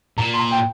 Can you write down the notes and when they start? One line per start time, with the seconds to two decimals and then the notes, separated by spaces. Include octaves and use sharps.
0.18 A#2 A#5
0.34 C6
0.39 A#5
0.51 G5